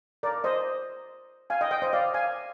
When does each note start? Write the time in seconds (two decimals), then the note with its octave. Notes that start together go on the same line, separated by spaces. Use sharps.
0.23 A#4 D5
0.44 C5 D#5
1.50 F5 G#5
1.61 D#5 G5
1.71 D#5 G5
1.82 C5 D#5
1.93 D5 F5
2.14 F5 G#5